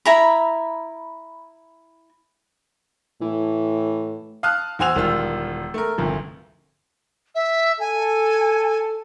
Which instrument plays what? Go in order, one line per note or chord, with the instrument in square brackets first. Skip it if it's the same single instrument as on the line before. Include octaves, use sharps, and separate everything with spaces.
[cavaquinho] E4 A#5 B5
[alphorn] A2 [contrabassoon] E3
[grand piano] F5 A5 D#6 F6 F#6
E2 F#4 C5 G#5 E6 F7
E1 D#3 G3 F4 E6
A3 A#4
G1 D2 C3 D#3 F3
[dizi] E5
[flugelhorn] A4 [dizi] G#5